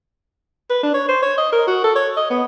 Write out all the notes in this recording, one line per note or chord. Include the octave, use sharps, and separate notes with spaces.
B4
D4
C#5
C5
C#5
D#5
A#4
F#4
A4
C#5
D#5
B3